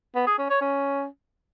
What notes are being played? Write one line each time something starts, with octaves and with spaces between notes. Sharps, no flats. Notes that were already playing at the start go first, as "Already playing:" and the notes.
B3
G#4
C#4
C#5
C#4